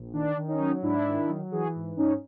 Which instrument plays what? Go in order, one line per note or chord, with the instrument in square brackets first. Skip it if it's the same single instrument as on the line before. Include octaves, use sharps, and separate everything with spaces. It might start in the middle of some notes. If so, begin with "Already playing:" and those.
Already playing: [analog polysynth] A#1
D#3 D4
D#3
C#4 D#4
F#3
G#2 D4 E4
D#3
F#3
E3 F#4 G#4
G#2
G#2 C#4 D#4